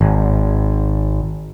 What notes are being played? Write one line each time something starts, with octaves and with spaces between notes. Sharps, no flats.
G#1